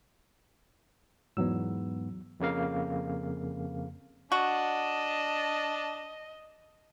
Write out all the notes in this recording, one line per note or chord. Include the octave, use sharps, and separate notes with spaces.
E2 G#2 F#3 B3 E6
F2 C#3 A#3 F5
D4 F#4 D#5 A5